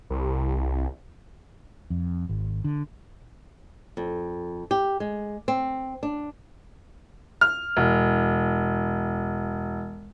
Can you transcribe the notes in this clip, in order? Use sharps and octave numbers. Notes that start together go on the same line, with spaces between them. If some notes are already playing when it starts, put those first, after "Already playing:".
C2
F2
G#1
D3
F2
G4
G#3
C4
D4
F6
E1